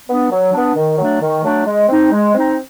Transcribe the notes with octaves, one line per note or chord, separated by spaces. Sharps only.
B3 D4
F#3
B3 D4
D#3
F#3 A3 D4
D#3
F#3 A3 D4
G#3
C4 D#4
G#3
C4 D#4